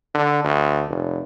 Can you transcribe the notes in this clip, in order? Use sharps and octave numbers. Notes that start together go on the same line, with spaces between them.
D3
D2
F1